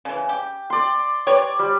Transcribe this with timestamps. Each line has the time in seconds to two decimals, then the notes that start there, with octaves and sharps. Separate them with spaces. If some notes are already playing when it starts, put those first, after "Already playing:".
0.05 C#3 E3
0.29 G4
0.70 D5 C6
1.27 G4 B4 C#5 D5
1.59 G3